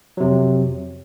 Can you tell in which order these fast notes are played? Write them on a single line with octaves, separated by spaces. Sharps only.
F#3 C3 F2